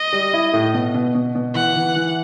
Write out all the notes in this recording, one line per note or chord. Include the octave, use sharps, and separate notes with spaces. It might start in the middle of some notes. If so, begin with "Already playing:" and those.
Already playing: D#5
G3
E4
A2
B2
B2
B2
B2
E3 F#5
E3
E3